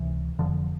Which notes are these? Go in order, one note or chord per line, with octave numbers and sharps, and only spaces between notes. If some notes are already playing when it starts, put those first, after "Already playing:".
Already playing: C#2 C3 E3
F1 F2 D3 F3